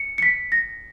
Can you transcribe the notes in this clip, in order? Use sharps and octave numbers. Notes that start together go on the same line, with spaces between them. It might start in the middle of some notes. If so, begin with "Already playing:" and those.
Already playing: C#7
C#7
B6
A#6